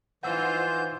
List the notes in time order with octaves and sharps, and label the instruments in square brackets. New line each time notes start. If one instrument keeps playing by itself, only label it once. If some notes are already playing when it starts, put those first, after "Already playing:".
[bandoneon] E3 G6 [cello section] D#4 F4 C5 [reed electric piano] F#5 E6